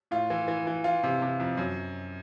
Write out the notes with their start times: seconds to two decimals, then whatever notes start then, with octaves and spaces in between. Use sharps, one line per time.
0.11 A2 F4
0.30 E3
0.48 E3
0.67 E3
0.84 E3 F4
1.03 C3
1.22 C3
1.40 F2
1.57 F#2